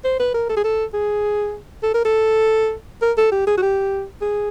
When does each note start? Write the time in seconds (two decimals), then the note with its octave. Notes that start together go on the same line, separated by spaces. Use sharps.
0.04 C5
0.20 B4
0.34 A#4
0.49 A4
0.57 G#4
0.64 A4
0.94 G#4
1.83 A4
1.94 A#4
2.05 A4
3.02 A#4
3.17 A4
3.32 G4
3.47 G#4
3.57 F#4
3.62 G4
4.21 G#4